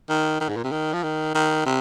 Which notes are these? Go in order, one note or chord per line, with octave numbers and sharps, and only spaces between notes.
D#3
D#3
G#2
A#2
C3
D#3
F3
D#3
D#3
C3